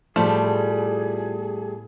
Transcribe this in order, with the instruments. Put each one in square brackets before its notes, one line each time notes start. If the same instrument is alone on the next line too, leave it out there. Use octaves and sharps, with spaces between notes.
[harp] A2 B3 [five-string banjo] F3 [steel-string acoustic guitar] G3 A3 [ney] G#4